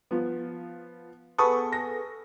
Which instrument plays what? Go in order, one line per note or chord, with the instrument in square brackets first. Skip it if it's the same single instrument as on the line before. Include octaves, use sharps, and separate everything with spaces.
[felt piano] F3 B3
[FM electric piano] B3 G#4 A4 [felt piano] B5 C#6 D#6
[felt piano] A#6